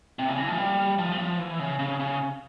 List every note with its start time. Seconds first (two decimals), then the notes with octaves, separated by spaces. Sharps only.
0.19 C3
0.28 C#3
0.38 E3
0.48 F3
0.57 G3
0.98 F3
1.12 G3
1.18 F3
1.39 E3
1.59 C#3
1.79 C#3
2.00 C#3